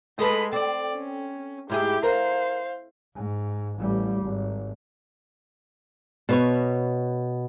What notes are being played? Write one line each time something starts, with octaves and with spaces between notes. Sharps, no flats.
G#3 D#4 A4 B4 B5
C4 D5
C#4
G#2 E4 G4 G#4
A#4 C5 F5
G#2
A1 G3
G#1
B2 B4 C#5